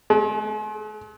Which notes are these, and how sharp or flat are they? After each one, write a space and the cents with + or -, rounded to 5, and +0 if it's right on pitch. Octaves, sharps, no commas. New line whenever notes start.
G#3 +45